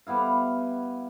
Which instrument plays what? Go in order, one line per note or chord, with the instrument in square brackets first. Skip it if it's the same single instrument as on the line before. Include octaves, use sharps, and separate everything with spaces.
[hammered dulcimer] G3 B3 E4 F5